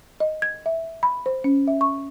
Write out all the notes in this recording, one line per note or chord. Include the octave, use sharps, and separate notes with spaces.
D#5
G#6
E5
B5
C5
C#4
E5
C#6